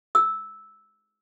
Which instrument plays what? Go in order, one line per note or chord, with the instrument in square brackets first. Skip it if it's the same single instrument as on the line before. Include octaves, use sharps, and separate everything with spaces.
[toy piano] E6